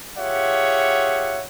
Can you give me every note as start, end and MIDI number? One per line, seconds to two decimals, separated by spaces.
0.18 1.43 65
0.18 1.43 67
0.18 1.43 68
0.18 1.43 73
0.18 1.43 76
0.18 1.43 78